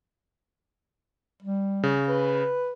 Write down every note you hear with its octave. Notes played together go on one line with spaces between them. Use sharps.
G3
C#3
B4